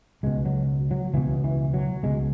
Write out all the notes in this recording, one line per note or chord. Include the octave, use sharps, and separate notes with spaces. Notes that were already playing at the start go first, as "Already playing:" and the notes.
C#2 B2 G#3
F#3
F#3
C#2 B2 E3
E3
F#3
C#2 B2 G#3